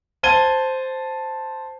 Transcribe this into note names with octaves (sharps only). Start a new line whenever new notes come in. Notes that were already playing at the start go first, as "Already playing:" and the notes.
C5 A5 G#6 D#7 G7